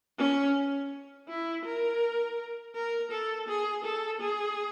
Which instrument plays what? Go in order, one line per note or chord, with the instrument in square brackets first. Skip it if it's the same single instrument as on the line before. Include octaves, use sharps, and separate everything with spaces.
[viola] C#4
E4
A#4
A#4
A4
G#4
A4
G#4